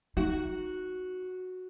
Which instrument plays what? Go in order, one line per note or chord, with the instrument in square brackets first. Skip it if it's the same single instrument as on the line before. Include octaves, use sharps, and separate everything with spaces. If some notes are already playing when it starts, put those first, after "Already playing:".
[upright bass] D#4 [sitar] F#4